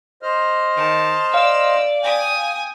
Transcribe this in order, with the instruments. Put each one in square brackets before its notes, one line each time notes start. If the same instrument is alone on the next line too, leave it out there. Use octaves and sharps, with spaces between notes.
[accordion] C5 D#5 F6
[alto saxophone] D#3 [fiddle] A5
[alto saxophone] D5 [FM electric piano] F5 [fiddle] E6
[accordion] G5 [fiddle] G#5 D#6